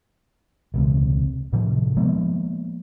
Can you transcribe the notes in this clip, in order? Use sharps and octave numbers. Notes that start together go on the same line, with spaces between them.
E1 C#2 C3
A2 C3 D#3 F3
F3 G#3 A#3 B3